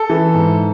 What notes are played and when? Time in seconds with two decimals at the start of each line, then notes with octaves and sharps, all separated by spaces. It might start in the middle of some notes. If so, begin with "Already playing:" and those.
Already playing: A4
0.10 E3
0.34 G#2